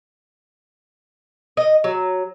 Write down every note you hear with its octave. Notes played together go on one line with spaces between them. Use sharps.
D#5
F#3